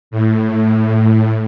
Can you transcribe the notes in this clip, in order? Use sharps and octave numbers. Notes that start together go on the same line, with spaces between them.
A2